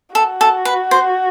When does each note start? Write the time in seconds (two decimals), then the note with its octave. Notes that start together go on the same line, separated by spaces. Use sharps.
0.15 F#4 A4
0.41 A4
0.65 B4
0.91 C5